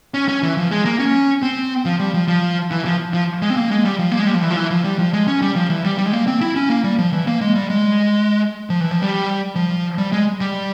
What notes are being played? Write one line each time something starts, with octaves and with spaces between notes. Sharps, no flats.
C#4
C#4
E3
F3
G#3
A#3
C#4
C4
F3
G3
F3
F3
E3
F3
F3
G#3
C4
A#3
G#3
G3
F3
A#3
G#3
G3
F3
E3
F3
E3
F3
G3
F3
G#3
C#4
G3
F3
E3
G3
G3
G#3
A#3
C4
E4
C#4
A#3
G3
F3
E3
A#3
G#3
G3
G#3
F3
E3
F3
G3
F3
G3
G#3
G3